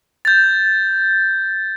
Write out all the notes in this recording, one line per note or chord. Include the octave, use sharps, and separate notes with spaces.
G6 A6